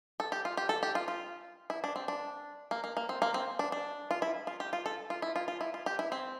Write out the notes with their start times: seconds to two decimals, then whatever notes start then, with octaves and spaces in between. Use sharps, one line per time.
0.20 A4
0.32 G4
0.45 F4
0.57 G4
0.69 A4
0.83 G4
0.95 F4
1.08 F4
1.70 E4
1.84 D4
1.96 C4
2.08 D4
2.71 A#3
2.84 A#3
2.97 A#3
3.09 C4
3.22 A#3
3.34 C4
3.59 D4
3.72 D4
4.11 F4
4.22 E4
4.47 F4
4.60 G4
4.73 F4
4.86 A4
5.10 F4
5.22 E4
5.36 F4
5.48 F4
5.61 E4
5.74 F4
5.86 G4
5.99 E4
6.12 C4